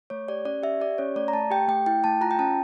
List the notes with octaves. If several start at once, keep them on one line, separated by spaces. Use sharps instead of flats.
A3 C#5
G4 D5
C#4 D5
G4 E5
G4 D5
C#4 C#5
A3 D5
A#5
A3 A5
G4 G5
A3 G5
E4 G5
A3 A5
F4 A#5
G5
C#4 A5